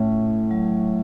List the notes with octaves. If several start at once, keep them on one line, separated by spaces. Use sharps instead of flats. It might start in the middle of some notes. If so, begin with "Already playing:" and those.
Already playing: A2 A3 C#4
F#3